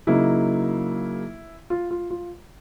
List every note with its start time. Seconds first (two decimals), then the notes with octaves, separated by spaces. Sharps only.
0.07 C#3 F#3 A#3 D#4 E4
1.70 F4
1.91 F4
2.10 F4